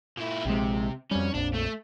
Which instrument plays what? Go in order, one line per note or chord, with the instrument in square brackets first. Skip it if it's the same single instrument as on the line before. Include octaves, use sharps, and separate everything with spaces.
[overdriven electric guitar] A#2 E4
[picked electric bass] A#1 G#3 [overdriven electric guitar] C3
[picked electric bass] F2 G3 [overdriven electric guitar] C#4
[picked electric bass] A#1 F2 [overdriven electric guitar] D4
[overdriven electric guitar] A3